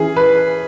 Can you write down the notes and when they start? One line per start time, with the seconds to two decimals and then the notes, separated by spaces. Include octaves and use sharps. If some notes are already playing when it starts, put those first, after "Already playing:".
Already playing: E3 C#4 G#4
0.16 B4